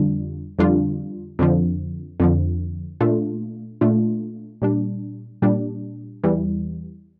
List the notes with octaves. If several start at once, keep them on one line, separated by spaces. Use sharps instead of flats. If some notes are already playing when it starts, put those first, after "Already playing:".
Already playing: F2 D3 G3 D4 F4
F2 D3 G3 D4 F4
F2 D3 F3
F2 D3 F3
A#2 A3 D4 F4
A#2 A3 D4 F4
A#2 G3 D4
A#2 G3 D4
E2 E3 G3